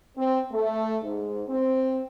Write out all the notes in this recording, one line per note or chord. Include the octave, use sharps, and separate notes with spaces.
C4
A3
G#2
C4